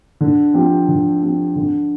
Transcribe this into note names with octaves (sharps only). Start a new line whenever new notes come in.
D3
F3 C4 G4
D3
F3 C4 G4
D3